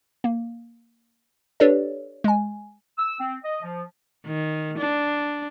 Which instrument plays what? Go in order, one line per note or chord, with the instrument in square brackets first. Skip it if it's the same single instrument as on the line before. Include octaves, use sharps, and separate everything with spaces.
[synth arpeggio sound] A#3
D4 G4 A4 B4 C#5 D5
G#3 G#5
[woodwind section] E6
C4
D#5
F3
[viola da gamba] D#3
D4